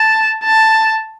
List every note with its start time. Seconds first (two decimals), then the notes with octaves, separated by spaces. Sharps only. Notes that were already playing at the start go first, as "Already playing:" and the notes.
Already playing: A5
0.44 A5